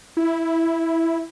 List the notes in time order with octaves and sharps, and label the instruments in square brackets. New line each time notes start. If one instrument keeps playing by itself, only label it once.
[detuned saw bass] E4